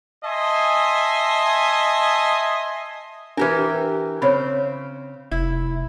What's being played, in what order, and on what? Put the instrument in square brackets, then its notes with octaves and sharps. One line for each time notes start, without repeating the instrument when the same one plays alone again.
[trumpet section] D#5 E5 G#5 A5 C6
[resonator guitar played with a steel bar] E3 G4 A#4 [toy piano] D4 B4
[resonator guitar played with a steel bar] C#3 C4 [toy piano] C5 C#5 B5
[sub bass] F1 [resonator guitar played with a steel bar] E4